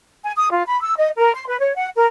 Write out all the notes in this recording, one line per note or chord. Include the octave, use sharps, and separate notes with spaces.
G#5
D#6
F4
B5
E6
D#5
A#4
C6
B4
C#5
F#5
A#4